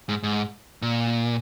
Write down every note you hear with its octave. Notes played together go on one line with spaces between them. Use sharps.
G#2
G#2
A#2